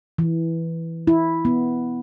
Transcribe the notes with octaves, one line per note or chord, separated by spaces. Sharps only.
E3
E4
B3